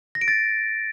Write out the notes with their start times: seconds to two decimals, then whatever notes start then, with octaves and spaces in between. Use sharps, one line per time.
0.15 A#6
0.21 D7
0.28 A6